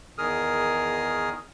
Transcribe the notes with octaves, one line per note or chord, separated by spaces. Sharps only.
E2 D#3 G#4 A#4 D#6 F6